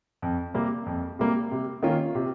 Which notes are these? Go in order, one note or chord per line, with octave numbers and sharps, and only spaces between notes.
F2
C3 G3 A#3
F2
C3 G3 A#3
C3
D#3 A#3 C#4 F4
C3